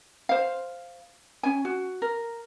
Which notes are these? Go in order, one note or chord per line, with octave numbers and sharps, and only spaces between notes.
C5 F5
C#4 G#5
F#4
A#4